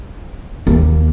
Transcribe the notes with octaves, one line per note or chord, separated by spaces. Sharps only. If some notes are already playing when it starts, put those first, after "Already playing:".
D#2